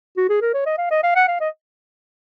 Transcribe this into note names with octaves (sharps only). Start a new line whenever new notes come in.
F#4
G#4
A#4
C#5
D#5
F5
D#5
F5
F#5
F5
D#5